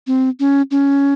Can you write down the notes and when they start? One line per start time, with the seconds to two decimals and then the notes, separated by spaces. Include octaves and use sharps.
0.07 C4
0.40 C#4
0.71 C#4